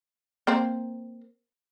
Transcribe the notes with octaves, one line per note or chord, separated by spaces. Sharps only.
A#3 C4 C5